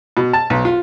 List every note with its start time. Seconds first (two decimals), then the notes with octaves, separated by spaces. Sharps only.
0.17 B2
0.33 A5
0.50 B1
0.65 F4